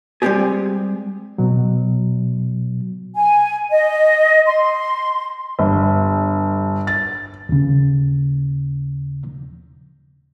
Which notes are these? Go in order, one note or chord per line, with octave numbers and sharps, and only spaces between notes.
G3 G#3 B3 C4 G4 G#4
B2 F#3
G#5
D#5
C6
G1
A6
D#2 C#3